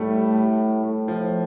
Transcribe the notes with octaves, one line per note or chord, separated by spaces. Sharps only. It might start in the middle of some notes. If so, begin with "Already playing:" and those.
Already playing: A2 G3 A3
A2
F3